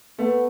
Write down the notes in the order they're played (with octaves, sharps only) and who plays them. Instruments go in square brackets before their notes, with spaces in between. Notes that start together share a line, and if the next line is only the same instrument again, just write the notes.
[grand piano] A3 [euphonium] B3